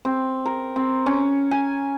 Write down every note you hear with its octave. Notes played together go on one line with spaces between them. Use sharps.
C4
A#4
C4
C#4
G#5